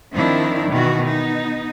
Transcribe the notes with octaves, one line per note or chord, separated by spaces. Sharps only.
D#3 F3 C4 D4 E4
B2 D#3 E3 F#4
B3 D#4